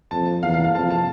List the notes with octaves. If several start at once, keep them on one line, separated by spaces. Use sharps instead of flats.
F2 A5
E2 F5
F5
F5
F2 A5
A5